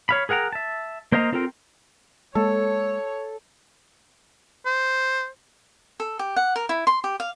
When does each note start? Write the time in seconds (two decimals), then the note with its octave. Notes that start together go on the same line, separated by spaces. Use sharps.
0.09 C#5 F5 B5
0.29 G#4 A#4 F#5 G5 A#5
0.52 E5 A5
1.12 A#3 C5 D#5 F5 A#5
1.32 C4 F4 A4 A#4 G5
2.35 G#3 A#3 A4 C#5
4.66 C5
6.00 A4
6.19 G4
6.36 F#5
6.56 A#4
6.69 E4
6.87 C6
7.04 G4
7.20 F5